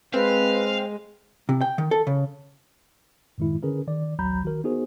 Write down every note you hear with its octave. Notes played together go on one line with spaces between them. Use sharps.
G#3 C4 B4 F5
C3
G5
D#3
A4
C#3
F#2 A2 D#3 G#3 E4
D3 C#4 G#4 A#4 B4
D#3 D5
A1 D2 F#3 A#5 B5 G6
D#3 F#4 A#4
B3 D#4 F#4 G#4 A#4 C5